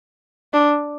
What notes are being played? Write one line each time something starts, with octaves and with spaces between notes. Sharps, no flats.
D4